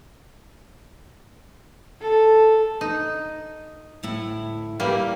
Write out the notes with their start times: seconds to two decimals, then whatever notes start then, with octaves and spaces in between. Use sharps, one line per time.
2.01 A4
2.81 D#4
4.03 D2 A2 E4
4.80 G3 A#3 E4 A#4 B4